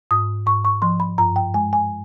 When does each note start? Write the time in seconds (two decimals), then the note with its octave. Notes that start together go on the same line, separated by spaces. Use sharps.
0.11 G#2 D#6
0.46 G#2 C#6
0.65 C#6
0.82 F3 C6
1.00 B5
1.18 G2 A#5
1.36 G5
1.54 G#3 G#5
1.73 G#5